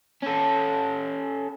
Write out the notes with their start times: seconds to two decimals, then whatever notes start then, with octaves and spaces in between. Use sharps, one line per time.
0.23 C#4 A4